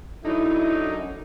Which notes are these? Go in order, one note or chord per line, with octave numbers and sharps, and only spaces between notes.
D3 F#3 D#4 E4
F#2